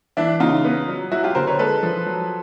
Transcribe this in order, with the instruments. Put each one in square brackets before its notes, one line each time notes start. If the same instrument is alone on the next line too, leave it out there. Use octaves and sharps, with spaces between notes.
[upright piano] E3 D4 E4
C#3 D#4 F4
B3
F#3
F#3 E4 F#4
F4 G4
D3 A#4 C5
B4 C#5
G#3 A4 B4
F3
F#3